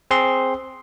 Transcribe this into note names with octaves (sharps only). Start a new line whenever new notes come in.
C4 G#4 C6